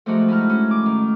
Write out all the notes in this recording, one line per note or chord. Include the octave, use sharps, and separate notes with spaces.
F3 G#3 A3 D4 D#4 F#4
D#4 E4 F6
C#4
D6
D#3